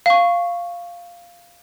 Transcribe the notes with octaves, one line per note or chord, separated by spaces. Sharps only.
F5 C#6